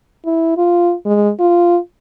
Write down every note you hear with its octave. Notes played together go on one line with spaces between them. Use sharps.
E4
F4
G#3
F4